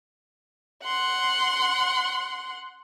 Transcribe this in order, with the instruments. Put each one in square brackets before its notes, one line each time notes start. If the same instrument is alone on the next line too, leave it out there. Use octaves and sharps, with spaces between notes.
[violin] F#5 C6